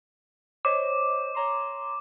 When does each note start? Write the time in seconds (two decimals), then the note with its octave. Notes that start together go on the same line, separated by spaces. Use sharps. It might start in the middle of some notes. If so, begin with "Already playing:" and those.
0.65 C5 C#5 D#5 D6
1.35 C#5 A#5 C6